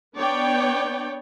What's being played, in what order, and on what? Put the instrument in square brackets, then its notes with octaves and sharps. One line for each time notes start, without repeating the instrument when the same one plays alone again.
[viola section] B3 D4 C#5 D5 G5